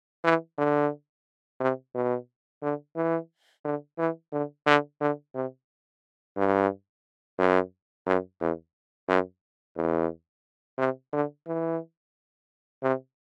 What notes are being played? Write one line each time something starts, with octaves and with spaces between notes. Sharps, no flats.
E3
D3
C3
B2
D3
E3
D3
E3
D3
D3
D3
C3
G2
F#2
F#2
E2
F#2
E2
C3
D3
E3
C3